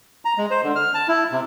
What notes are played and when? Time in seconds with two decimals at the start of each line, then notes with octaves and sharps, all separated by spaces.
0.25 A#5
0.38 G#3
0.51 C5
0.63 D3
0.75 F6
0.94 A5
1.08 E4
1.32 C3